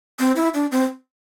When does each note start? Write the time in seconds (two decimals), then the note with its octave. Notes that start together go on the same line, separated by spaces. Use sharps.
0.20 C4
0.36 E4
0.54 D4
0.72 C4